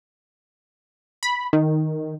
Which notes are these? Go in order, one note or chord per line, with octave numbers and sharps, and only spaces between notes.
B5
D#3